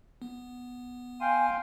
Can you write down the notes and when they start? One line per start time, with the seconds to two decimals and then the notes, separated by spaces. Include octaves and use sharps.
0.22 B3
1.21 F5 G5 G#5 C6